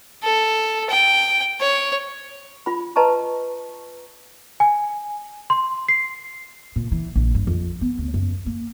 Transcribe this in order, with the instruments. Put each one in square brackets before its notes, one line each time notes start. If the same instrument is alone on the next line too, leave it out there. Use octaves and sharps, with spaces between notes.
[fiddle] A4
G5
C#5
[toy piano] F4 B5
B4 D#5 A5 A#5 C#6
[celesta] G#5
C6
C7
[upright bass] A#2
E3
A#1
G2
F2
B3
D2
F#2
A#3